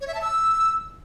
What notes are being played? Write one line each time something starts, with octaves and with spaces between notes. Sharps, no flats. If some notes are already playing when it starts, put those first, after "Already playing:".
C#5
E5
A5
E6